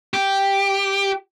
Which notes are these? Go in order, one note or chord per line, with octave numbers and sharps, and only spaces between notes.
G4